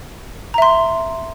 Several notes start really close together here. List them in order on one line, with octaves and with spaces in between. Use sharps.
A#5 E5 C6